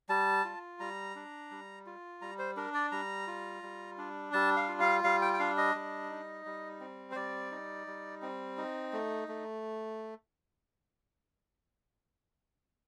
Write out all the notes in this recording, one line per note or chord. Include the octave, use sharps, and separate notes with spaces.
G3 A5
F4
G3 A#5
D4
G3
F4
G3 A#5
C5
D4 A#4
D5
G3 A#5
F4
G3
D4
G3 A5
F5
F4
F5
G3 F5
G5
G5
D4 F5
D#5
G3
D#4
G3
C4
C5
G3 D5
D#4
G3
C4
D#4
A3
A3